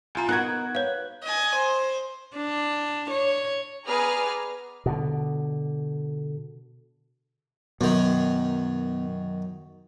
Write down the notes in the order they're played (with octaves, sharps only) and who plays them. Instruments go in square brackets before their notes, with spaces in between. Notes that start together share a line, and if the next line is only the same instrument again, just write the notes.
[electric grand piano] C2 F4 [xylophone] G#5 A#5
[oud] B3 F#4 [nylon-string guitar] D#4 A#4 [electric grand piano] F#6 G#6
[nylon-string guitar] B4 [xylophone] C#5 F5
[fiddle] D#5 G#5
C5
[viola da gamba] D4
C#5
[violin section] B3 G#4 B4 D5 A#5 F6
[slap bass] B2 D3
[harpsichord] F#2 D#3 [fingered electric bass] B2